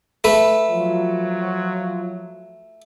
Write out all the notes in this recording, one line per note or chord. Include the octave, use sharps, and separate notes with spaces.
A3 B4
F3 F#3 F4